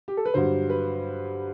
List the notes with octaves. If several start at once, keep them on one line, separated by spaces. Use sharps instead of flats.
G4
A4
B4
G2 D3 F#3 C5
B4